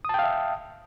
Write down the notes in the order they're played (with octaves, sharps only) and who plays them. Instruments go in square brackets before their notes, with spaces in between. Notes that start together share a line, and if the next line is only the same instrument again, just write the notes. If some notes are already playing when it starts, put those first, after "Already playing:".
[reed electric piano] D#6
A5
G5
F5
E5